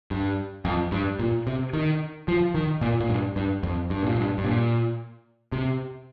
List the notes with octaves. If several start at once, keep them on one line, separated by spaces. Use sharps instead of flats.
G2
F2
G2
A#2
C3
D#3
F3
D#3
A#2
A#2
G2
G2
F2
G2
A#2
G2
G2
A#2
C3